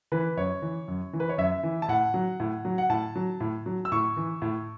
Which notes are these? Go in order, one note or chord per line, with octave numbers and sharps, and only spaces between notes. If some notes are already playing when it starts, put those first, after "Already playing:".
E3 B4
F#2 C#5
E3
F#2
E3
B4
C#5
F#2 E5
E3
A5
A2 F#5
F#3
A2
F#3
F#5
A2 A5
F#3
A2
F#3
E6
A2 C#6
E3
A2